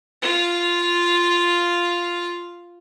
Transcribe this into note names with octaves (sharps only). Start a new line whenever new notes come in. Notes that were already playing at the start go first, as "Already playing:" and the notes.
F4 F5